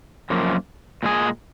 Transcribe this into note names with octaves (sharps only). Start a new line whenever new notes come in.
F#2 F3 A#3
A#2 G#3 D#4 G#4